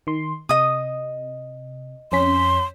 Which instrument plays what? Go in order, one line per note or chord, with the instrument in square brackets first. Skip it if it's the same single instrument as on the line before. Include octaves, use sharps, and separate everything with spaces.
[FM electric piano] D#3 C6
[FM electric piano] C3 [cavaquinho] D#5 D#6
[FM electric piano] F2 C#4 B6 [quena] C6